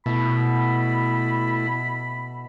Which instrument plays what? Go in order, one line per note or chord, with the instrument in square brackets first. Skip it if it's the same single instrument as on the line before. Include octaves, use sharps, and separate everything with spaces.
[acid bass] B2 [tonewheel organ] A3 E4 [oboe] B5